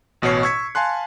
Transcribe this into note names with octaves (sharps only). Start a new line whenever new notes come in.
A1 B2 F#4 C#5 C7
C#6 E6 G#6 B6 C#7
F5 G#5 A5 C6 F#6